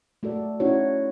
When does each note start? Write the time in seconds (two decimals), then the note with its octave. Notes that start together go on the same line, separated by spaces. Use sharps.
0.23 A3 F#4 A4 D5
0.60 C#4 D#4 E4 F#4 C#5